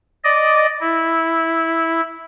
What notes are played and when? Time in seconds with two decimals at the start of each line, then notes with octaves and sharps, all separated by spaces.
0.24 D5 D#5
0.81 E4